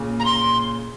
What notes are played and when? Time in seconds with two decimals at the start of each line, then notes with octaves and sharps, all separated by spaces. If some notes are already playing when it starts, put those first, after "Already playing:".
Already playing: A#2 C#3
0.20 A#5
0.25 C6